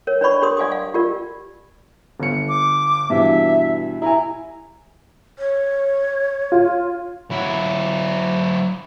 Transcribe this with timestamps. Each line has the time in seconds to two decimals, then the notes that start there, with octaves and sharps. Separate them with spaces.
0.07 A#4 C#5
0.21 D4 B4 C#5 D5 B5 C#6
0.42 D4 G4 A#4 C6 D#6
0.57 D5 F5 G#5 D6 D#6
0.72 F5
0.94 F4 G4 A#4 D5
2.20 G1 C#7
2.49 D6
3.10 G2 B2 E3 E5
4.02 E4 G#5 A#5
5.39 C#5
6.52 F4
7.31 F#3 E4